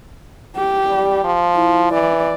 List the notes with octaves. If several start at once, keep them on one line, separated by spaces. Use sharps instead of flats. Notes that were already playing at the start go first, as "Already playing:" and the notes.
G4
G3
F3
E4
E3 D5